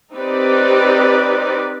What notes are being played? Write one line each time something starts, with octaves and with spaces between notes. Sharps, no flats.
C4 D#4 G4 B4 D5